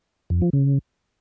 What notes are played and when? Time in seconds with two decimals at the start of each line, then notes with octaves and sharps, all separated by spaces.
0.30 F2
0.42 F3
0.53 C#3